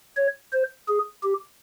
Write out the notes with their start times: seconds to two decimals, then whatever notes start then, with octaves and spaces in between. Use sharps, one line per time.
0.17 C#5
0.52 C5
0.88 G#4
1.23 G4